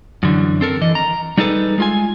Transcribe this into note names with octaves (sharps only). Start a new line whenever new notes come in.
F#2 D3 E3
C4 A4 A#4
E3 D#5
A#5
G3 D#4 G#4 A4 B4
G#3 F4 G#5